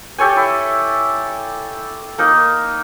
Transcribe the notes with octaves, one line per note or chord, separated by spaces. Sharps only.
G4 A4 C#5 G#5
E4
A#3 D#4 A#4